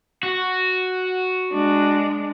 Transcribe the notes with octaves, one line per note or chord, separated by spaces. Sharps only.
F#4
G#3 D4